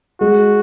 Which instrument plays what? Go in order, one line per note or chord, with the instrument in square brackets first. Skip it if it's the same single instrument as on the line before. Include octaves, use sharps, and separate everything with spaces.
[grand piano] G#3 [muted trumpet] F#4